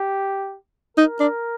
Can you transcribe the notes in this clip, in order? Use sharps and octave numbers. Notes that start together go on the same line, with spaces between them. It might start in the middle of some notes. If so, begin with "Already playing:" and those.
Already playing: G4
D#4 A#4
D4